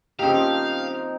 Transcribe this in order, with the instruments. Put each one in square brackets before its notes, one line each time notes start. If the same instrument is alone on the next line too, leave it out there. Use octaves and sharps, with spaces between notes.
[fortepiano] C#3 G4 [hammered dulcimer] F3 C4 D#4 [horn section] A#3 [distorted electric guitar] F5